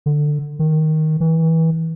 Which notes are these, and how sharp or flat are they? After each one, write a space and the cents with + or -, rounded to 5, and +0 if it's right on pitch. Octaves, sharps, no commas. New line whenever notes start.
D3 +15
D#3 +5
E3 -25